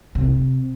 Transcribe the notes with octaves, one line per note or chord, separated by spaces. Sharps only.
C3